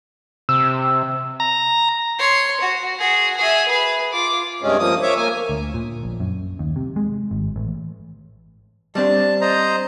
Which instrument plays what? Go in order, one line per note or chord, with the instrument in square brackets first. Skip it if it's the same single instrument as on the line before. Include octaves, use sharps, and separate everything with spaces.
[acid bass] C3 [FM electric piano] E6
[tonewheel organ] A#5
[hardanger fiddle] C#5 C6
F#4
F#4 G#4
G#4 E5
G#4 B4
F4 D6
[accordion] G2 C3 G#3 C#4
F3 A#3 D#6
C#5 E5 D6
A#3 G#5
[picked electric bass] D2
A#2
A#1
F#2
D#2
C3
G#3
G#1
A1
[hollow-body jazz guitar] G3 C4 D4 [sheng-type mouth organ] A5
[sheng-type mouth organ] C5 D#5 A#5